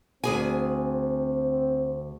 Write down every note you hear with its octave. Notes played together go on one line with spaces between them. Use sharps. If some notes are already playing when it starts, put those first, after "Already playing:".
D2 C4 G#4 G#5